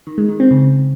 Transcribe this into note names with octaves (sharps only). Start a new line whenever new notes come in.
D#3
G#3
D#3
C4
C#3